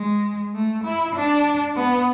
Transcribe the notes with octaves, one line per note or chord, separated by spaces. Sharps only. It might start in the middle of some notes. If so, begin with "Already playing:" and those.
Already playing: G#3
A3
E4
D4
B3